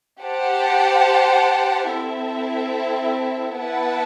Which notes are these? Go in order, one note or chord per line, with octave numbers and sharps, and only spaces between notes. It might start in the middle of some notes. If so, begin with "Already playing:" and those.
G4 C5 F#5 A5
C4 E4 A4 E5
B3 E4 B4 F#5 A5